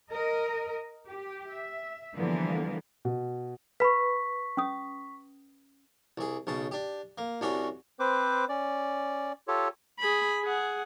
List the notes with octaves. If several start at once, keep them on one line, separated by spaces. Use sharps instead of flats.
A#4 D#5
G4
E5
D3 E3 F3 G3 A#3 B3
B2
B4 B5 C#6 B6
C#4 D#6
C2 G#4
B1 C#3 A5
D4 G4
A#3
C2 C3 C#4 D4 F#4 C#5
C4 B4 C5 D6
C#4 D5
F4 G4 A4 C#5
G#4 B5
G#4 F#5